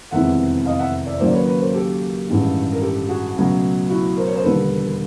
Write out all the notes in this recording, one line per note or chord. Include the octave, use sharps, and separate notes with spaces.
F1 E2 C3 D#3 G#3 E5 F#5
D#5 F5
E5 F#5
D5 E5
D#2 C#3 F#3 A#3 C5 D5
B4 C#5
B4 C#5
A#4 C5
G4 A4
A1 G2 D#3 G#3
A#4
G4 A4
F#4 G#4
C#2 B2 F#3 A3
E4 F#4
A#4 C5
C#5
C5
E1 D#2 D3 G3 A4 B4